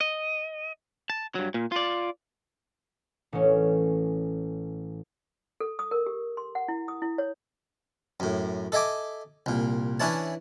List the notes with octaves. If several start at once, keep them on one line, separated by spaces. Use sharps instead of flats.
D#5
A5
G2 F#3
A#2
F4 D5
A1 C#4
A4
D#6
A#4
G4
C6
F#5
E4
D#6
E4
C#5
F#2 A2
A4 D#5 E5 G#5 D6
C2 A#2
E3 C#4 D4 E4 C#5 A5